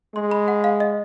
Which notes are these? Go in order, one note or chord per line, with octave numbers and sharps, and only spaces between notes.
G#3 C6
B5
F#5
F5
D#5